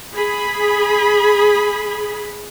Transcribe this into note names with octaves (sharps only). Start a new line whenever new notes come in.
G#4 B5